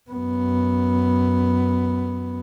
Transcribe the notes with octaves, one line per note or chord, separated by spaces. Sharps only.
F#2 B3